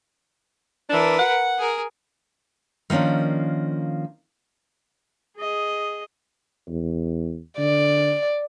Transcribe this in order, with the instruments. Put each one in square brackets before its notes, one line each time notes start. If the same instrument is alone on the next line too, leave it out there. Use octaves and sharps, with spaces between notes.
[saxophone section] E3 D4 [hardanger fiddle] A#4 B4
[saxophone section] F#5
[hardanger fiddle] G#4 A#4
[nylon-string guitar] D#3 F3 A#3 C#4 D4
[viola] G#4 D#5
[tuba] E2
[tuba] D3 [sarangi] D5